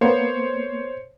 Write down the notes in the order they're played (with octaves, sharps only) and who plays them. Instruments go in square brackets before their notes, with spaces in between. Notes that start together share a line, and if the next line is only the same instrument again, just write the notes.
[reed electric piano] A#3 B3 [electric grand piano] C5 C#5 C6